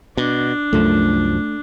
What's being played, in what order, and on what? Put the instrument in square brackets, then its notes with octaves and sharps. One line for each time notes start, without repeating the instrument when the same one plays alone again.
[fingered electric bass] B2 [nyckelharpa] D4
[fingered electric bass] C2 F#2 F3 [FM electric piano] A3